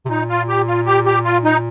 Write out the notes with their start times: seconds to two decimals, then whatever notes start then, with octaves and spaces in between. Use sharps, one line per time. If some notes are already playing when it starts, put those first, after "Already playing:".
0.05 C3
0.09 A#2 D#4
0.29 F4
0.49 G4
0.67 F4
0.86 G4
1.06 G4
1.25 F4
1.44 D#4